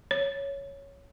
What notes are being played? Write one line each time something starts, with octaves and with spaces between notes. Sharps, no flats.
C#5